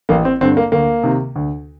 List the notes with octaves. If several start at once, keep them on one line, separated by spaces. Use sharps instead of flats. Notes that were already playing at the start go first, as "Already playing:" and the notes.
A1 A#3
C4
G2 D3 C4
A#3
D2 A#3
C3 D#3
D2